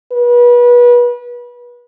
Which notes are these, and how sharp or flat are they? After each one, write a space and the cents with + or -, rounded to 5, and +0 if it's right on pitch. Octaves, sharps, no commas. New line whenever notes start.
B4 -30